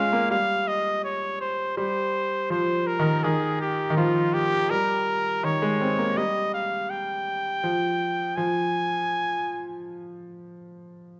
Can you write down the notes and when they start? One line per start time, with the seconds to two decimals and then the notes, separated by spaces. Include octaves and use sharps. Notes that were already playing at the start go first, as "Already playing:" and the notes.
Already playing: G#3 C#4 F4 F5
0.13 A#3
0.31 G3 F5
0.67 D#5
1.04 C#5
1.41 C5
1.77 G3 C5
2.50 F3 C5
2.87 A#4
2.99 D#3
3.23 D#3 G#4
3.61 G4
3.90 D#3
3.97 F3 F4
4.33 G4
4.70 G3 A#4
5.43 D#3 C#5
5.62 G#3
5.81 C4
5.98 A#3
6.17 G3 D#5
6.54 F5
6.90 G5
7.64 F3
8.36 F3 G#5